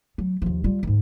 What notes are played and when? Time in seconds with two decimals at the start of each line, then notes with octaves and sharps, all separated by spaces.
0.18 F#3
0.42 D#2 F3
0.64 G3 F4
0.83 D2 G#2